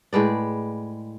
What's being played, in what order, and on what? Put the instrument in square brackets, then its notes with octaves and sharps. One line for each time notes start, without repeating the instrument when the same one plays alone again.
[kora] A2 G#3 B4 D5